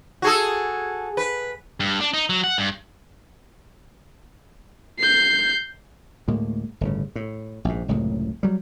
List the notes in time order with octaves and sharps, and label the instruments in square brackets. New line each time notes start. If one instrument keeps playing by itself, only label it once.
[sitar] F#4 G#4 A4
B4
[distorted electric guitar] G2
D4
D#4
F#3
F#5
G2
[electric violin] G6 C7
[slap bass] D2 A2 G#3 A#3
G1 A2 C#3
A2
A#1 G#2
F#1 C#2 A2 C3
F#3 G3